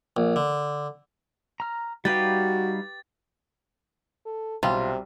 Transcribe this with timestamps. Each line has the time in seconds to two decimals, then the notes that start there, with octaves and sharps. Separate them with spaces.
0.17 A#1
0.36 D3
1.60 A#5 F6
2.05 G3 D#4 F#4 G4 B4 F5 A6
4.26 A4
4.63 B1 C3 G3 F4